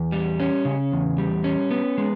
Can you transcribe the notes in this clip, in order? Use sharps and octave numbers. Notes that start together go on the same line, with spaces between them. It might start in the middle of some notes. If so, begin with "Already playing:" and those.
Already playing: E2
G3
C#4
C#3
E2
G3
C#4
B3
G#3